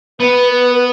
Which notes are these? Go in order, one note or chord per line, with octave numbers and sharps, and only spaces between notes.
B3 B4
B4
B4